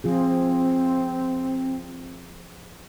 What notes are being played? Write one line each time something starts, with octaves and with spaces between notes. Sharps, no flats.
F3 C4 F4 G#4